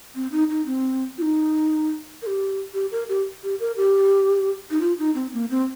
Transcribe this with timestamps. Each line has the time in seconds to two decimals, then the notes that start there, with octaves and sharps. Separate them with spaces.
0.15 C4
0.32 D#4
0.50 D#4
0.66 C4
1.18 F4
1.22 D#4
2.22 A#4
2.27 G4
2.74 G4
2.92 A#4
3.09 G4
3.43 G4
3.60 A#4
3.77 G4
4.71 D#4
4.81 F4
4.99 D#4
5.15 C4
5.33 A#3
5.50 C4